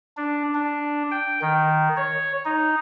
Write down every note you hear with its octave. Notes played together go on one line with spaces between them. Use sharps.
D4
D4
G5
D#3
C#5
D#4